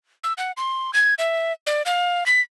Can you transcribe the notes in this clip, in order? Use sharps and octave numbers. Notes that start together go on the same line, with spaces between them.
E6
F#5
C6
G#6
E5
D5
F5
B6